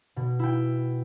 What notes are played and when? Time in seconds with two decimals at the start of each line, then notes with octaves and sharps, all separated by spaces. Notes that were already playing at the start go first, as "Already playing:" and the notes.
0.16 B2
0.39 E4 G5